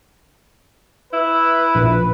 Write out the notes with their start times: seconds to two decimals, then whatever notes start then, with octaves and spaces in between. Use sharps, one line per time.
1.13 E4 B4
1.75 A#1